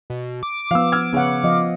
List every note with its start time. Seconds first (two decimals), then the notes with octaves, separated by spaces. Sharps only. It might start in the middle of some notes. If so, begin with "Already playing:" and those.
0.10 B2
0.43 D6
0.71 F3 B3 F5 E6
0.92 E6 F6 G#6
1.13 C#3 B3 C#4 F#5
1.44 F3 D#5 F5